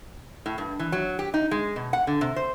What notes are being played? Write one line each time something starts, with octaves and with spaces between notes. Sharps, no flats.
A2
G2
E3
F#3
G4
D#4
G#3
B2
F#5
D3
C3
C5